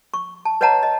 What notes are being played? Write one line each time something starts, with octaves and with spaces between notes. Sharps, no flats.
C#6
A5
B4 C#5 D#5 F#5 A5 A#5
D#5